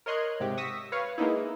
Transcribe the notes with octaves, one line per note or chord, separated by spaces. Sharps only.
A#4 C#5 D#5 C6 F#6 G#6
G#2 C3 G4
C#6 D#6 E6 A#6 B6
B4 C#5 F5 C#6
G#3 A#3 B3 D#4 E4